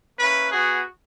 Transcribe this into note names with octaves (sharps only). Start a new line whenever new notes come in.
A#3 C#4 E4 B4
B3 F#4 G#4